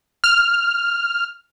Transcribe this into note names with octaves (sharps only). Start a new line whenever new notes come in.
F6